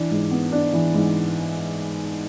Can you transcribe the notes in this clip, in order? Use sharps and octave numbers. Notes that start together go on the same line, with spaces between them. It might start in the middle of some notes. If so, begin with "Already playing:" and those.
Already playing: E3 D4
G#2
B3
D4
E3
G#2